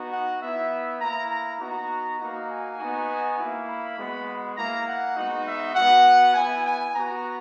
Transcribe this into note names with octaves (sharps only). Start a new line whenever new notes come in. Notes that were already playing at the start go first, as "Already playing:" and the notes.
Already playing: B3 D#4 F#4
F#5
B3 E4 E5
A#3 E4 A#5
A#5
B3 D#4 F#4 A#5
A#3 D#4 F#4
G#5
B3 D#4 F#4
A#3 E4
B5
G#3 B3 F#4
A#3 E4 A#5
F#5
G#3 B3 D#4 F#4
E5
B3 F#4 F#5
B3 E4 G#5
G#5
B3 F#4 A#5